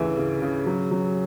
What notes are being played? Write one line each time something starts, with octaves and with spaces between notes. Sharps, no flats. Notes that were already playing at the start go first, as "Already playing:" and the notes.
Already playing: D2 C#3 E3 E5 G#5
C#3
C#3
F#3
F#3